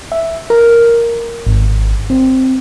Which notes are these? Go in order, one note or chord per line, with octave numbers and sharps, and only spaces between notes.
E5
A#4
G#1
C4